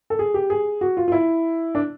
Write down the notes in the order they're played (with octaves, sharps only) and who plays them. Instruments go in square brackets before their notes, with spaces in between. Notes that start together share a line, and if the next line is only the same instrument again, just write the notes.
[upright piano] A4
G#4
G4
G#4
F#4
F4
F4
E4
D4